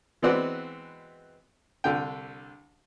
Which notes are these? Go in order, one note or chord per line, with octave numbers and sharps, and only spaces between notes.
E3 G#3 B3 C4 F#4 D5
C2 D3 G5